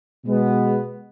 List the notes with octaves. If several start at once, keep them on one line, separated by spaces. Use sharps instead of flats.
B2 G#3 B3